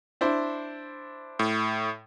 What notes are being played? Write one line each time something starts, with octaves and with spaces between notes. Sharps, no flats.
D4 E4 C5
A2